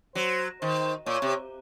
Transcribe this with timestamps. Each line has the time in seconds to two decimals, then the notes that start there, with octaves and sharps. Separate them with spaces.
0.15 F#3 C5
0.61 D#3 C5
1.06 A#2 C#5
1.22 C3